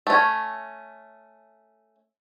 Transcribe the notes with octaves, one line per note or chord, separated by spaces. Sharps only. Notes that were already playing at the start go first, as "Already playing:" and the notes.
A3 C#4